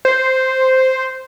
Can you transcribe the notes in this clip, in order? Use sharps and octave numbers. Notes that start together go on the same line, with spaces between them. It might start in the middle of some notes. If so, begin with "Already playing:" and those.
C5